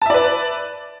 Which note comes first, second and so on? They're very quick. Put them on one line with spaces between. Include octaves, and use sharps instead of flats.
A5 E5 D5 B4